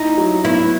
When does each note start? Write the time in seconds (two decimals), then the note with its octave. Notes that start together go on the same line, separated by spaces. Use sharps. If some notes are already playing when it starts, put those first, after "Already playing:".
Already playing: D#4 E4
0.18 F#3
0.45 B3 E4